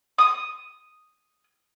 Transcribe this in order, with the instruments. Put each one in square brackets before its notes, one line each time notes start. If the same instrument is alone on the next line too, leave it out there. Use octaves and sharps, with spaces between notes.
[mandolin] D#6